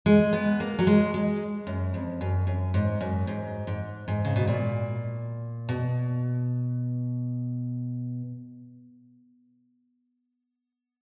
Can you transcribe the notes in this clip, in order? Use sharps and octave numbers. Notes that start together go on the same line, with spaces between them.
G#3
B3
A#3
F#3
G#3
G#3
F#2
F2
F#2
F#2
G#2
F#2
G#2
G#2
G#2
C#3
B2
A#2
B2